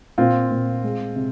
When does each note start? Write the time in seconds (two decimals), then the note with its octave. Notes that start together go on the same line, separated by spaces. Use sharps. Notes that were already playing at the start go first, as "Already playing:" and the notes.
0.18 A#2 C4 F4
0.51 A#2
0.84 G#3
1.16 C3